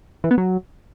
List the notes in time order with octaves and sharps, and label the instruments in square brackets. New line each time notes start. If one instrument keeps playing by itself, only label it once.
[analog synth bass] E3
B3
F#3